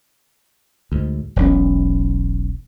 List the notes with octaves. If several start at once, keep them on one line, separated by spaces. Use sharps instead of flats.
D2 G#2
E1 B1 C#4